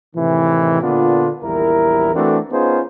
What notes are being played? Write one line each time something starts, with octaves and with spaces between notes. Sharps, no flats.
A2 C3 D#3 E3
A#2 D3 B3 D4 F4
A#1 E2 G3 E4 A#4
E3 A3 C4 D4 F#4 A4
B3 C#4 D#4 F4 G#4 C5